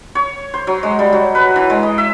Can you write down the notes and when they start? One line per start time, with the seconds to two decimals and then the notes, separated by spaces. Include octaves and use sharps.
0.15 C#5
0.54 C5
0.67 F#3
0.83 G#3
0.99 G3
1.12 F#3
1.35 B4
1.56 E3
1.70 G#3
1.83 D#5
1.98 E5